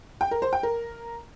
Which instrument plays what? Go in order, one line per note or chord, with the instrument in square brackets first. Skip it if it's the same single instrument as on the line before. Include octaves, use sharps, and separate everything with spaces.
[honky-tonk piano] G5
A#4
C5
G5
A#4